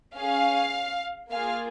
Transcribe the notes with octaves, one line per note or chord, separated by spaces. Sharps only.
C#4 G#4 F5
A#3 F4 G#4 F5